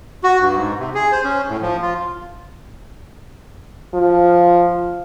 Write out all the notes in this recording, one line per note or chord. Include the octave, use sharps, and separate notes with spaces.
F#4
G2
G#2
C3
G#4
C5
C#4
A2
F3
F4
F3